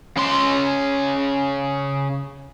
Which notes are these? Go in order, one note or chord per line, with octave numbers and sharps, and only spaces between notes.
C#3 C6